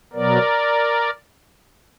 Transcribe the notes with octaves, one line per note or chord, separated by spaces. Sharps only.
B2 F#3 B3 A#4 D5